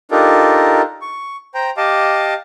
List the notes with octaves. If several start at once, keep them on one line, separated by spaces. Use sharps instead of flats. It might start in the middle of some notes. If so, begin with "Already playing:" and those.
D4 D#4 F4 G4 A4 A#4
C#6
C5 G5 A#5
G4 D#5 F5 A5 D6